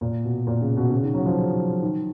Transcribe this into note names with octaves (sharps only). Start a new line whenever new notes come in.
A#2
B2
A#2
C#3
B2
C#3
D#3
F#3
F3
D#3